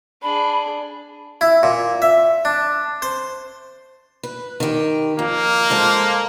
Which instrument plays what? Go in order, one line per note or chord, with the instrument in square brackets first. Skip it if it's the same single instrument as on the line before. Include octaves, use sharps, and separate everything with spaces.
[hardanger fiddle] D4 G#4 [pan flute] B5
[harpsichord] E4
A#2
E5
D4
C5
[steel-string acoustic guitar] B4
D#3 G4
[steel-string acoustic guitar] F2 [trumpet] A#3
[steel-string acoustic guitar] G#3 A4 C5